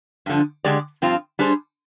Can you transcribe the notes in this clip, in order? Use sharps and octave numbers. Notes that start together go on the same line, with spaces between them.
G2 D3 F3
D3 G#3 D4 G4 D5
G2 F3 C4 F4
G3 D4 G#4 C5